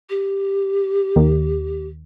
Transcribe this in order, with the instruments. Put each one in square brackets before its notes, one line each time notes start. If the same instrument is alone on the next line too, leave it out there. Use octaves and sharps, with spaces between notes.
[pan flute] G4
[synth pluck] D#2 D#3